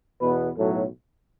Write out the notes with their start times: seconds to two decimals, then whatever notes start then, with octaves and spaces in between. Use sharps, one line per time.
0.20 E2 B2 B3 B4
0.55 B1 A2 F#3 A4